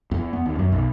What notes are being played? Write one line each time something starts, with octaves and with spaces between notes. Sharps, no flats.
E2
B3
D#2
F#2
B1